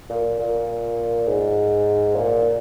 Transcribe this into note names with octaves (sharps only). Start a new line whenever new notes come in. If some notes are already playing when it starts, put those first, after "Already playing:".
A#2
A#2
G#2
A#2